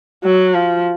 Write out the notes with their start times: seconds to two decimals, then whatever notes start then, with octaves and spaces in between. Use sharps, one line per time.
0.24 F#3
0.55 F3